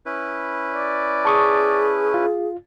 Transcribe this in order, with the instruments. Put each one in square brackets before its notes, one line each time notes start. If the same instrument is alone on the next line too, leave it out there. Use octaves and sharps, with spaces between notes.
[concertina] C#4 E4 B4
[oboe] D5
[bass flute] G#4 [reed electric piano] A5 C#6 D#6
[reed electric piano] F4